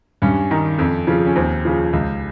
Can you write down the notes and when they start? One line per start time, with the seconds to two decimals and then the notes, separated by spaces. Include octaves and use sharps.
0.22 G2 C#4
0.51 D#3
0.79 F2
1.07 C#3 F3
1.26 C#4
1.35 D#2 C4
1.65 C#3 F3
1.93 C#2